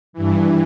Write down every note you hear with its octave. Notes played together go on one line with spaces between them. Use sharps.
G2 E3